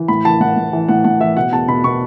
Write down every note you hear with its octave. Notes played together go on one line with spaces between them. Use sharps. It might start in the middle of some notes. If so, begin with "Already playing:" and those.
Already playing: E3
A2 B5
E3 A5
A2 F#5
A2
E3
A2 F#5
A2 F#5
E3 E5
B2 F#5
E2 A5
B2 B5
B2 C#6